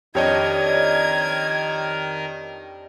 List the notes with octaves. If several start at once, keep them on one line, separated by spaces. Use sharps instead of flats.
F2 D#3 D4 G4 A#4 C#5 D#5 G#6